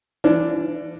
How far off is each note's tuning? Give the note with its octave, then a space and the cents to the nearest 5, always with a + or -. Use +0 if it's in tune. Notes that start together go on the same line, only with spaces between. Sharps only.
E3 +40 D4 +0